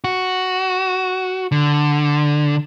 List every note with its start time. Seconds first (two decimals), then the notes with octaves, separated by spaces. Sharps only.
0.04 F#4
1.52 D3